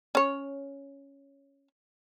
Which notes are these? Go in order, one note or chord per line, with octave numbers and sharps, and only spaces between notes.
C#4 C#5